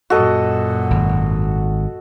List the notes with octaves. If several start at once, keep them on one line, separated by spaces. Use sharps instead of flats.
F#2 A#2 F#4 A4 D#5
G#1